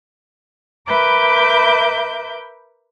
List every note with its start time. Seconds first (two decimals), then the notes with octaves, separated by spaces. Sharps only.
0.87 A#4 B4 E5 B5 D6 G6